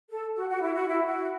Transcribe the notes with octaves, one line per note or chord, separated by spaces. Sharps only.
A4
F#4
F#4
E4
F#4
E4
F#4